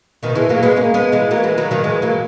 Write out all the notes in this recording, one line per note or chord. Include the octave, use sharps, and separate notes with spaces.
B2 D#3
E3 G#3
F#3 A#3
G#3 B3
A#3 C#4
G#3 B3
E3 G#3
F#3 A#3
E3 G#3
D#3 F#3
D#3 F#3
E3 G#3
F#3 A#3